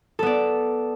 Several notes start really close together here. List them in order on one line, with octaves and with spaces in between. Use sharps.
A4 B3 D5